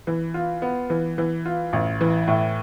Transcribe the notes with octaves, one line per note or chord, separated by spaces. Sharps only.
E3
F4
B3
E3
E3
F4
A1
E3
A2